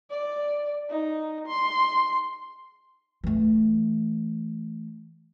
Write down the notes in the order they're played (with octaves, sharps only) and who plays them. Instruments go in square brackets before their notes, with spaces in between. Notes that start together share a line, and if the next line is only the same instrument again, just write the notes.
[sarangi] D5
D#4
C6
[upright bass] E3 A3